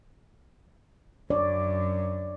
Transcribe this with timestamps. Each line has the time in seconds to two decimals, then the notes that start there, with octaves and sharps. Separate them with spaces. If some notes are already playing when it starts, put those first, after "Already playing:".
1.30 F#2 D4 C#5 D5